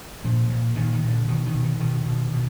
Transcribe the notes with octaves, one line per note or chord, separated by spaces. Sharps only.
A#2 F3
A#2
A#2 D#3
D#3
A#2
D3
B2 D#3
D#3
B2
D#3
B2 D#3
B2
B2